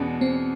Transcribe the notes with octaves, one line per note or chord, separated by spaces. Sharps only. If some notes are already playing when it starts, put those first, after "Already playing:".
Already playing: E2 B2 G#3 B3 C#4 D4
C4